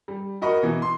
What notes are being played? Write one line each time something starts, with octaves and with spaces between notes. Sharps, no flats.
G3
F#4 A#4 D#5 B5 C#6
B2 E3
C6